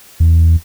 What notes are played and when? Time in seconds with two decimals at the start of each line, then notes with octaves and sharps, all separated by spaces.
0.20 E2